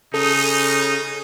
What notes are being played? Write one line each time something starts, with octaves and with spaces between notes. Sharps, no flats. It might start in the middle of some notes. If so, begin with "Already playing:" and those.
C#3 D#4 A4 D#6